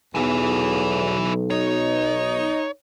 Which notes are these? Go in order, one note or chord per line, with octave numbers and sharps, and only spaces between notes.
B1 E2 E4 G#5
D#4 C#5